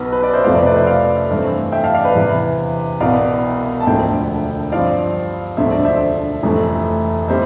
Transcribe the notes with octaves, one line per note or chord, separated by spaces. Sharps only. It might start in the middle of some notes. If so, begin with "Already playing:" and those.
Already playing: B1 B2 B3 B4
B4
B4 D5
C5 E5
F2 C3 F3 A3 D5 F5
B4 D5
B4 D5
C5 E5
D5 F5
G2 E3 A3 C4
E5 G5
F5 A5
D5 F5
B4
E2 C3 E3
C2 B2 B3 D5 F5
A5
E1 D2 D3 F3 E5 G5
G2 F3 C4 D5 F5
E1 D2 D3 F3 A3 E5
D5
C5 E5
F1 F2 E3 A3
A2 G3 C5 E5